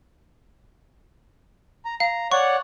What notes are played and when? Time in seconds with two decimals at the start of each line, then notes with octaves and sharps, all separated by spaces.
1.85 A#5
2.00 F5 A#5
2.32 C#5 D5 F#5 C#6